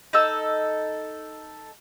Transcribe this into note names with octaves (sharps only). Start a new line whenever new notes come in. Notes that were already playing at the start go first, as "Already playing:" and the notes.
D#4 A4 E6